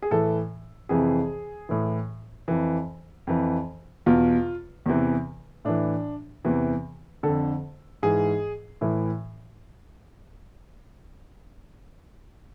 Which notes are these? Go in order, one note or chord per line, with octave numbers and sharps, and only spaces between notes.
G#4
A2 E3 A4
F2 C3 E3 G#4
A2 E3
F2 E3
F2 E3
E2 B2 F4
E2 C3 E3
A2 E3 D4
E2 C3 E3
F2 D3 A4
G#2 E3 G#4
A2 E3